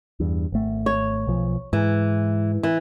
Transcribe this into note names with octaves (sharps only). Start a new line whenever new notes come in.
E2 G2
G#1 A3
C#5
B1 F3
G#2 E3
E3